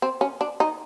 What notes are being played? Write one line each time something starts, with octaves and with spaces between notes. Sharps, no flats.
C4
C#4
D4
D#4